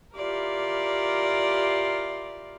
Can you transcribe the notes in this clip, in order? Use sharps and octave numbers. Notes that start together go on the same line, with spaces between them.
E4 F4 G4 A#4 D5